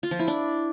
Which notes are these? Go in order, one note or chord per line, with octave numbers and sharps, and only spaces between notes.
F4
F3
E4
D4